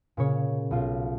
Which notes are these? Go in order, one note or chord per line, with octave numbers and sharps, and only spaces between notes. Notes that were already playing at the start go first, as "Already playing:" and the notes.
A#2 C#3 C#5
B1 F4